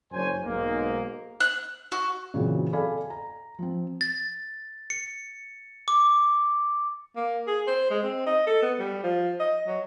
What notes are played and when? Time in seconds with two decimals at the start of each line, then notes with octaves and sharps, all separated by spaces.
0.12 F#1 F#2 D4 C5 C#5 G#5
0.42 B1 G#2 A#3
1.40 F#6
1.92 F#4
2.34 A#2 C#3 E3 F#3 C4
2.73 A4 D5 F5 G#5 B5
3.10 A#5
3.59 F3 C4
4.01 A6
4.90 C#7
5.88 D6
7.16 A#3
7.47 G#4
7.67 C5
7.90 G#3
8.03 C4
8.26 D#5
8.47 A4
8.63 B3
8.79 G3
9.03 F3
9.40 D#5
9.67 F#3